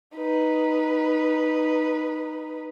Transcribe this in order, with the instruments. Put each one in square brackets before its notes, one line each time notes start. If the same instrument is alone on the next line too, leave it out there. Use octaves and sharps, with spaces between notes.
[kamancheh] D#4 B4